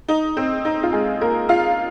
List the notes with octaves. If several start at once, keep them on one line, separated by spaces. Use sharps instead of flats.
D#4
C4
D#4
F4
G#3 G#4
A#3 A#4
F4 F5